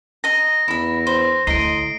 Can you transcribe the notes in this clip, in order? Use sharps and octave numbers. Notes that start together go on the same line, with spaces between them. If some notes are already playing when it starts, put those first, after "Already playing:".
D#5 A#5 A#6
E2 E4 B5
C5
D2 A2 D#5 A#5 C6 C7 D7